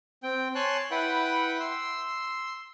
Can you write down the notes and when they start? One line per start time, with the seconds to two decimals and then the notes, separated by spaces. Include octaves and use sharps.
0.23 C4 G5
0.55 C#5 G#5 A5 C6 F#6
0.91 E4 B4 F#5 G5
1.60 C6 E6